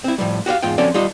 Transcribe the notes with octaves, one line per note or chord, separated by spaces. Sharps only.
C4 E4
A2 F3 G3
F#4 G4 C5 F5
E2 G#2 F4 G5
F3 C4 C#4 F#4 A4 D5
G3 D#4 F4 D#5